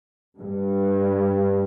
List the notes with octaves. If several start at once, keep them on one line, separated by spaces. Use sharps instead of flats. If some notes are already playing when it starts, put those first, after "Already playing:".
G2